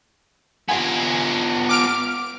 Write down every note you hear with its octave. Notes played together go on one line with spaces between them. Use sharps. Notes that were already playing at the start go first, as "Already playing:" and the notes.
B3 F4 G#5
D6 F6 D7